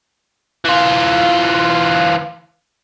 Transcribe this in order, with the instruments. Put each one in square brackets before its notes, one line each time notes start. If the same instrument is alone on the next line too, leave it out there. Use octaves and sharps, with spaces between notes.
[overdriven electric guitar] E3 F4